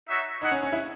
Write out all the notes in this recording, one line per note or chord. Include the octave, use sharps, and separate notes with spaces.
D#4 F#4 C#5 E5
D#4 E4 G#4 D#5 F#5
C#4
C#4
E4